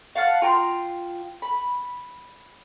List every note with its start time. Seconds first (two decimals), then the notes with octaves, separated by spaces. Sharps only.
0.15 F5 F#5 A5 F6
0.42 F4 G5 A#5 C6
1.42 B5